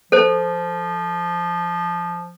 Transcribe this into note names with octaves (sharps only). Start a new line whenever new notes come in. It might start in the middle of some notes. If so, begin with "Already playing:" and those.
F3 A4 C5